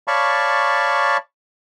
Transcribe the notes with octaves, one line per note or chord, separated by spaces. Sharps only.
C#5 D5 F5 A5 B5 C#6